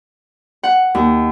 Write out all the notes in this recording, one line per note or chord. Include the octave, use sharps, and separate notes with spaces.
F#5
D#2